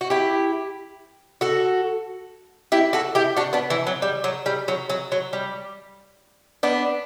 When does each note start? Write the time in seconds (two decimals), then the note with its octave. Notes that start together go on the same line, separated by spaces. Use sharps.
0.01 F#4
0.10 E4 G4
1.41 F#4 A4
2.72 E4 G4
2.93 F#4 A4
3.15 E4 G4
3.37 D4 F#4
3.53 B3 D4
3.70 E3
3.87 F#3
4.02 G3
4.24 F#3
4.46 G3
4.68 F#3
4.90 F#3
5.12 F#3
5.33 G3
6.63 B3 D4